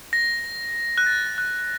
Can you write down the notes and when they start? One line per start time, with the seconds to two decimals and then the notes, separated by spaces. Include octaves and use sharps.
0.13 A#6
0.98 F#6
1.07 A6
1.26 A6
1.38 F#6
1.59 F#6